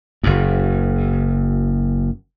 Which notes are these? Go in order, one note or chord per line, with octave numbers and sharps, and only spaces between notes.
F#1 F#2